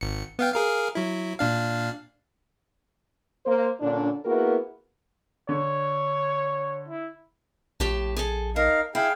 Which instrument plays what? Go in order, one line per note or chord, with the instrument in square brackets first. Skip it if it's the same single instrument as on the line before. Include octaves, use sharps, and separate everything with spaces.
[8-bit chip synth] G#1 C#7
B3 F5 G5
G#4 A#4 F5
F#3 E4
A#2 D4 F5
[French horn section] A#3 C5
A#2 D3 C#4 D4
A#3 B3 E4 F#4 G#4 A#4
[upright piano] D3 [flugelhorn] C#5
[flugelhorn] E4
[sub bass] A#1 [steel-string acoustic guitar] A2 G4 A5
[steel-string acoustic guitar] G#4 A4
[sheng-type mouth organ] D#4 F5 [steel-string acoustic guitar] A#4
[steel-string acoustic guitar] E4 [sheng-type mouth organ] G#4 F5 G5